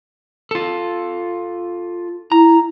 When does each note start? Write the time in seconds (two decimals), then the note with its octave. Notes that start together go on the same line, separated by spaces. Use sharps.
0.51 F4 A4
2.32 E4 A#5